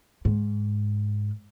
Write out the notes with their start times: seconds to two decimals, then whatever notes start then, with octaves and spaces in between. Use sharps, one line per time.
0.25 G#2